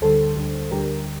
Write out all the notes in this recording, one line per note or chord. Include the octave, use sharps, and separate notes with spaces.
D2 D3 G3 A4 C5
D2 D3 G3
D2 D3 G3 G4 A#4